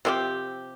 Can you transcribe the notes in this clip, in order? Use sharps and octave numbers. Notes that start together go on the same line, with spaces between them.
C3 F3 C4 G4